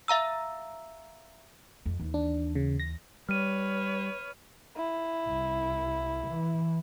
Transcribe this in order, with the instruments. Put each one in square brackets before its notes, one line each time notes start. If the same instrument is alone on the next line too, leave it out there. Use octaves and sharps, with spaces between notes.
[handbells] E5 F5 A#5 E6
[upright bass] F2
D#2 E3
[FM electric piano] D4
C#3
A#6
[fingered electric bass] G3 [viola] B4 C#5 [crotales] F6 D#7
[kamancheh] E4
[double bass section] C2
E3